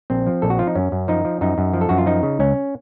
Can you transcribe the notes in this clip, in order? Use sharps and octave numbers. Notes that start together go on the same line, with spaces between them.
A#1 C4
F3
A#1 A4
F#4
F3 F4
D#4
F#2 C#4
F#2
F3 D#4
F3
F#2 D#4
F#2
F3
A4
F#2 F#4
F4
F3 D#4
C#3
C#2 C#4